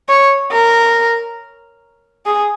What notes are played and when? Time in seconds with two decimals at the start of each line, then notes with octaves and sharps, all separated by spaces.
0.09 C#5
0.52 A#4
2.26 G#4